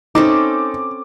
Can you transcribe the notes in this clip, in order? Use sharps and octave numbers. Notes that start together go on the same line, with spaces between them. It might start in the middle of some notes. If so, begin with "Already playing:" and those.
C4 C#4 D#4 A4 D6